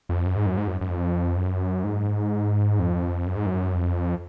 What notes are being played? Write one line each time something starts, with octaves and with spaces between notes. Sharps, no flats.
F2
F#2
G#2
F#2
G#2
F#2
F#2
F2
F#2
G#2
F2
F#2
G#2
F#2
F2